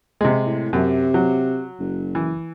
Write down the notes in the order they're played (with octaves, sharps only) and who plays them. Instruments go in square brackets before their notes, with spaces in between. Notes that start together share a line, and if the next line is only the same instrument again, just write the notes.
[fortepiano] C3 G#3
[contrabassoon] A2
[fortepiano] F#2 [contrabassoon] C3
[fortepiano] F#3
[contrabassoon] F#1
[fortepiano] E3